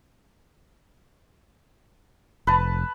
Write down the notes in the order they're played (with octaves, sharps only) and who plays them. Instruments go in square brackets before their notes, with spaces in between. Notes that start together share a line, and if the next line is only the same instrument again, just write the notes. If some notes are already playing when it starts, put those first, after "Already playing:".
[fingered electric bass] F1 [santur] B4 A5